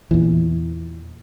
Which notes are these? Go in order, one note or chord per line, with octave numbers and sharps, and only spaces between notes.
E2 A#2 E3